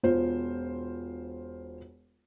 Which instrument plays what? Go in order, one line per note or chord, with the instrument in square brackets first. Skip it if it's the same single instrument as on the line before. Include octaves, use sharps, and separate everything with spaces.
[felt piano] E1 F4 C5